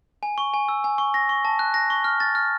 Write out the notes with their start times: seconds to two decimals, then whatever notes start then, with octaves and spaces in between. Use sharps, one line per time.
0.23 G#5
0.38 C#6
0.54 G#5
0.69 E6
0.84 G#5
0.98 C#6
1.14 A#6
1.29 C#6
1.45 A5
1.59 F#6
1.74 A#6
1.90 C#6
2.04 F6
2.20 A6
2.35 F6